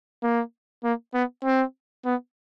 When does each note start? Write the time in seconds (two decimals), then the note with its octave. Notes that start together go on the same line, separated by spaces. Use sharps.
0.23 A#3
0.84 A#3
1.14 B3
1.45 C4
2.05 B3